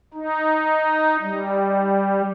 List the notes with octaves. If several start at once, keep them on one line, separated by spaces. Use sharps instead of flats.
D#4
G3